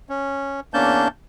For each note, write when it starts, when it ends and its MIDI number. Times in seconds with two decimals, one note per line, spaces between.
0.09 0.60 61
0.74 1.08 40
0.74 1.08 58
0.74 1.08 61
0.74 1.08 62
0.74 1.08 81
0.74 1.08 91